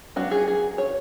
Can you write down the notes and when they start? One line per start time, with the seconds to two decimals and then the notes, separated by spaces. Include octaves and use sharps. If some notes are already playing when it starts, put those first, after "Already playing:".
0.16 F#3 B3 D4 F#4
0.31 G#4
0.48 G#4
0.78 C#5